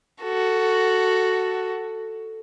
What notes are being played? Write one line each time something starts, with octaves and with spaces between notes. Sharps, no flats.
F#4 A4